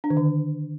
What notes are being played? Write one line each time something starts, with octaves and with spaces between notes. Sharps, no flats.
D4
D#3
D3